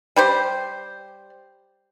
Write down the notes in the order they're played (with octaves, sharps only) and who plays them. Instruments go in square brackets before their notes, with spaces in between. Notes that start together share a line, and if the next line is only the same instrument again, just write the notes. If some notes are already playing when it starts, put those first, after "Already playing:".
[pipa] G3 G4 C5